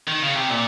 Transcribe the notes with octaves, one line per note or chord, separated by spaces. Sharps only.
D#3
C#3
C3
A#2